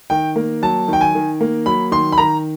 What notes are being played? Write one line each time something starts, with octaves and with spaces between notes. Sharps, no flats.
D#3 G5
A#3
F#3 A5
D#3 G5
G#5
D#3
A#3
F#3 B5
D#3 C6
B5
D#3 A#5